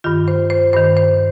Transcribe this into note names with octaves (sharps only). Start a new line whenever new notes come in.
G2 D#3 F4
C5
C5
G2 D#3 C5
C5